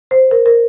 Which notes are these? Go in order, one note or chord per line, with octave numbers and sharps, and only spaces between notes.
C5
A#4
A#4